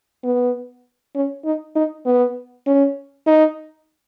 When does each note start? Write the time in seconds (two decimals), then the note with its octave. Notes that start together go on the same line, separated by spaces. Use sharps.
0.24 B3
1.15 C#4
1.45 D#4
1.76 D#4
2.06 B3
2.67 C#4
3.26 D#4